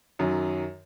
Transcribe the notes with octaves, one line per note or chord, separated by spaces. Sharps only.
F#2 D#3 F#3